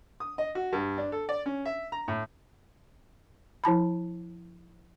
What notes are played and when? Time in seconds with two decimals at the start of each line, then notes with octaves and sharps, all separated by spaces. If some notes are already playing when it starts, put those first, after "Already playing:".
0.20 D#6
0.38 D#5
0.55 F#4
0.73 G2
0.98 D4
1.12 A4
1.29 D5
1.46 C#4
1.65 E5
1.92 A#5
2.08 A2
3.64 F3 E4 A5 B5